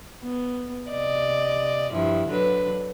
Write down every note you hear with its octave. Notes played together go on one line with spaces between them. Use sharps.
B3
C3 D5 D#5
G2 F3 E4
D3 F#3 B4